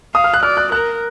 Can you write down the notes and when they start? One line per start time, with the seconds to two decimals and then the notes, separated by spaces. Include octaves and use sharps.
0.15 F5 D#6
0.24 F6
0.34 F#6
0.43 D5 F6
0.57 F#6
0.72 A#4 F#6